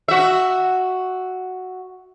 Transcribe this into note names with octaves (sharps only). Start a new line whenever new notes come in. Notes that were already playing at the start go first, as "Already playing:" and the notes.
F#4 E5